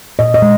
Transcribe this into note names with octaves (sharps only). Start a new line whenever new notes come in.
A#2 D#5
D#5
G#3